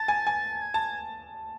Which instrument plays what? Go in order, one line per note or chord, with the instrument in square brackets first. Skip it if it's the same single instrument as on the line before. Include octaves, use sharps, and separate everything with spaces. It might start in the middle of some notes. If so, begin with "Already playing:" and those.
Already playing: [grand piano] A5 [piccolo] A6
[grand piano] G#5
G#5
[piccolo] G#6
[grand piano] A5